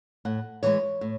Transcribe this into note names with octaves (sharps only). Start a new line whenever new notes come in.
A2 F#5
E3 G#3 C#5
A2